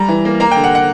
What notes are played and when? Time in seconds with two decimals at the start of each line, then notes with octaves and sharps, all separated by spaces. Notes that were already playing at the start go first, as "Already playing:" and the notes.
Already playing: G3 A#5
0.08 E3
0.25 A#3
0.40 A#3 A#5
0.51 D3 G5
0.64 F#5
0.75 F#5